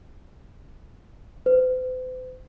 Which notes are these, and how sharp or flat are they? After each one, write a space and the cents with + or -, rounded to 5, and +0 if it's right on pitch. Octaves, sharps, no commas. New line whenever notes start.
C5 -45